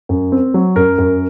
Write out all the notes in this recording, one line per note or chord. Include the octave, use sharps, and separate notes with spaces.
F#2
C4
F#3
F#2 A#4
F#2